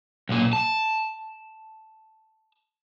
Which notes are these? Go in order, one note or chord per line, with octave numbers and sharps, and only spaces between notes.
B1 A#2
A5